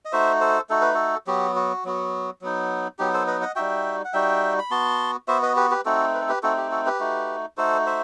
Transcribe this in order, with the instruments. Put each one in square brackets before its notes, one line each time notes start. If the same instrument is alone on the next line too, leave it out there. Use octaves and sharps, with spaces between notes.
[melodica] D#5
A3 D#4 F#4 C5 E5
A4 C5
A3 D#4 F#4 A4
B4
F#4 A4
F#3 B3 F#4 G4
F#4
F#3 B3 F#4
F#3 B3 D#4
F#3 B3 D#4 G4
A4 C5
B4 D#5
D#5 F#5
G3 D#4 F#4 E5 G5
F#5
G3 D#4 F#4 E5 G5
B5
B3 F#4 A5 C6
B3 F#4 C5 E5
B4 D#5
G4 B4
G4 B4
A3 C4 D#4 F#4 A4
B4
A4
G4 B4
A3 C4 D#4 F#4 A4
G4
F#4 A4
G4 B4
A3 D#4 F#4
A3 D#4 F#4 A4 C5
C5 E5